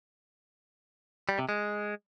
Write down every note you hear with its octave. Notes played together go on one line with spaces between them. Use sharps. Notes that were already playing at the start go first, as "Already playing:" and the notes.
G3
C3
G#3